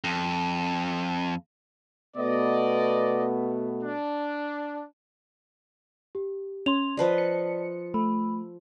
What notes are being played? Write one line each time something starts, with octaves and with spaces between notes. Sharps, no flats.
F2
B2 A3 B3 D5 D#5
D4
G4
C#4 C6 F7
F3 B4 D5 D#5 A5
C#7
A3 B5